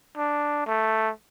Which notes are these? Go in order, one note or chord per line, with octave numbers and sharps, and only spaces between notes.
D4
A3